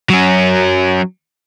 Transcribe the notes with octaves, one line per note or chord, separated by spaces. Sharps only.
F#3 C#4